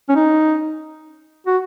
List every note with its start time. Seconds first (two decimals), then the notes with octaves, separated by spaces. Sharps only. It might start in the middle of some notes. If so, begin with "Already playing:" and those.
0.09 C#4
0.16 D#4
1.47 F#4